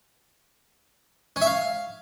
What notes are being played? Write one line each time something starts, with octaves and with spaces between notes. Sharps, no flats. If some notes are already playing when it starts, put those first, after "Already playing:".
C#4
E5
F5